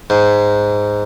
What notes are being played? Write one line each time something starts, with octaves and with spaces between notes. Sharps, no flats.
G#2